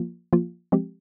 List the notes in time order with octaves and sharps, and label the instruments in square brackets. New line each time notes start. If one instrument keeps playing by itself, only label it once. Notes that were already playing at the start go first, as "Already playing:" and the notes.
Already playing: [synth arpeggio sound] F3 A#3 F4
F3 A#3 F4
F3 G#3 C4 G4